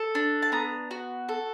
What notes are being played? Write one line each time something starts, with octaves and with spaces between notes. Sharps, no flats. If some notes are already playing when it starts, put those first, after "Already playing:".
Already playing: A4
D4
A5
B3 A#5
F#4
A4